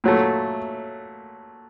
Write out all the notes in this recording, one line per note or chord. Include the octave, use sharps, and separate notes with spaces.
A#2 F#3 A3